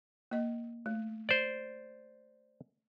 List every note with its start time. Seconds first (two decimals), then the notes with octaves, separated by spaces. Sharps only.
0.31 A#3 D#5
0.86 A3
1.29 C5 D5